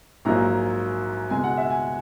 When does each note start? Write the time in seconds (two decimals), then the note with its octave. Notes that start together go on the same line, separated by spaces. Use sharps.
0.25 A#1 G#2 F#3 A#3 A#5
1.30 C#2 B2 G#3 G#5
1.44 F#5
1.57 E5
1.70 G#5